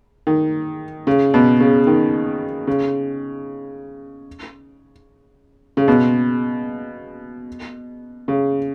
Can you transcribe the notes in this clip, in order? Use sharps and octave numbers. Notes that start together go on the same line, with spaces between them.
D#3
C#3
B2
C#3
D#3
C#3
C#3
B2
C#3